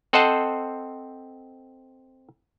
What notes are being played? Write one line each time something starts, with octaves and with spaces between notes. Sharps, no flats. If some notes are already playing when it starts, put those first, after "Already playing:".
C4 A4 C5 D#5 F#5 A5